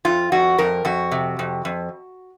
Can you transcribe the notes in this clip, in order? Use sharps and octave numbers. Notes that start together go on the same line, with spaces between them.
F2 F4
F2 F#4
F2 A#4
F2 F#4
C3
F2
F2